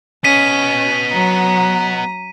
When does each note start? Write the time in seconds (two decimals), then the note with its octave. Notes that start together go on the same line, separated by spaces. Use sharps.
0.24 B3 C#4 D#5 B6 D#7
1.12 F#3 A#5